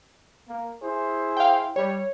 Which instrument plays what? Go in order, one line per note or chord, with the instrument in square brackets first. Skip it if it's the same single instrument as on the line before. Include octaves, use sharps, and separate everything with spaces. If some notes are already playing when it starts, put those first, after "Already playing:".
[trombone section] A#3
E4 G#4 C5
[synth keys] F5 G5
[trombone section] G3 [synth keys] C#5